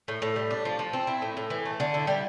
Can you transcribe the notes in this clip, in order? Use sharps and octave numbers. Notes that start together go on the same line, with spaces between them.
A2
A2
G3
D4
F3
F3
C4
E4
A2
A2
E3
A3
D3
E4
G3